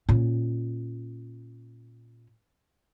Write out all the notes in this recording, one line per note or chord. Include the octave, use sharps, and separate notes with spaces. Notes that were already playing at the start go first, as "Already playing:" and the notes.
A#2 C#4